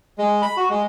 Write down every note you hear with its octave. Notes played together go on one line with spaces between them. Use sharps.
G#3
B5
F#4
G#3